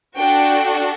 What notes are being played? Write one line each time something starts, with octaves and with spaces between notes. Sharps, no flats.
D4 F#4 A4 G5